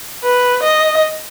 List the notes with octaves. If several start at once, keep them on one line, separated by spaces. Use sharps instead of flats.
B4
D#5